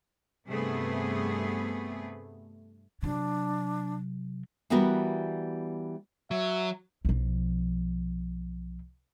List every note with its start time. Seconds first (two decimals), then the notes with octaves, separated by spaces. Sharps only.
0.48 G2 C3 A3 B3 G#4
3.03 C3 F#3 D4
4.70 E3 G3 B3 F#4 A#4
6.31 F#3 E5
7.05 B1 F3